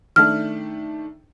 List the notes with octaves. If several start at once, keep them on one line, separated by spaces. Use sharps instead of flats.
D#3 A3 D4 F6